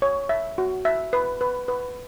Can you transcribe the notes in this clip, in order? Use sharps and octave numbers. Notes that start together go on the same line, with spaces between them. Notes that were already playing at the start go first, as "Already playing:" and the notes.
C#5
E5
F#4
E5
B4
B4
B4